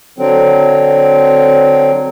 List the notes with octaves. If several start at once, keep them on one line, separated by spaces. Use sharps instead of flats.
D3 F#3 C4